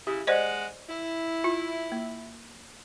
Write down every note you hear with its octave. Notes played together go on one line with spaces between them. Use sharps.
C#3 E4 G4
G#3 C5 D5 D#5 F#5
E4
F4
A#3